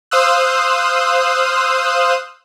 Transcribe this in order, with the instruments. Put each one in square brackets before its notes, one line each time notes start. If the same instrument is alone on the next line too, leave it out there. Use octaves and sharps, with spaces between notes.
[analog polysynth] C5 F5 D#6 E6 F#6